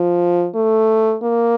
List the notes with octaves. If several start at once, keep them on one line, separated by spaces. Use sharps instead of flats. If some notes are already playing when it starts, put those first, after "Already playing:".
Already playing: F3
A3
A#3